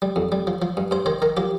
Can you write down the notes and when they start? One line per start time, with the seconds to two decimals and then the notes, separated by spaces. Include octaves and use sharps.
0.02 G3
0.16 F2
0.32 G3
0.47 F3
0.62 F3
0.77 G2
0.91 G2 C5
1.06 D#3 C5
1.22 D#3 A#4
1.37 F3 G4